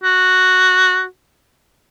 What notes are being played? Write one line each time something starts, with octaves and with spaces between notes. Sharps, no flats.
F#4